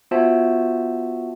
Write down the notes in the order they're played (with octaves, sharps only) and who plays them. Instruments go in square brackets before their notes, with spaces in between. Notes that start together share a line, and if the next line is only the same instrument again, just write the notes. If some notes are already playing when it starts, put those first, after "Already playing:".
[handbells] B3 F4 F#4 C5 E5 A5